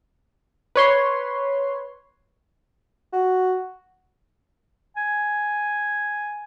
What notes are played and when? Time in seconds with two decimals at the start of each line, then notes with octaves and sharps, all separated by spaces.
0.76 B4 C#5 C6
3.12 F#4
4.97 G#5